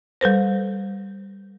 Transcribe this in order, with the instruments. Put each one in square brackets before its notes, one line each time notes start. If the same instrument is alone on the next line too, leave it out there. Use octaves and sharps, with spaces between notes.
[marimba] G3 A4 B4 C5